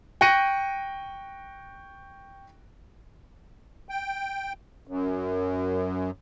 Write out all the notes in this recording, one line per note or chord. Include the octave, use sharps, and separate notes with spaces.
G5 C#6 F#6 A#6 C#7 D#7
G5
F#2